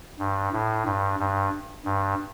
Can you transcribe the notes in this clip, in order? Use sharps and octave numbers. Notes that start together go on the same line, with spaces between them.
G2
A2
G2
G2
G2